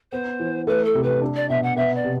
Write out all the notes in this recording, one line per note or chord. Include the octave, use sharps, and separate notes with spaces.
B3 C5
E3
A3 B4
A4
C3
B4
D4
D5
B2 E5
F#5
B3 E5
D5
C3